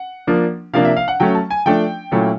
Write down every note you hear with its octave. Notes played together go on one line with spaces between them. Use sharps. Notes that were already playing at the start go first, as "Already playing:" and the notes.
Already playing: F#5
F3 A#3 D4
C3 F3 A#3 D4 F5
E5
F5
F#5
F#3 A3 C#4 G5
A5
G#5
F3 A3 D4 G5
A#2 F#3 A3 C#4 E4